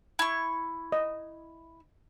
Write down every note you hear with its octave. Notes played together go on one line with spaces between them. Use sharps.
E4 C#6
D#5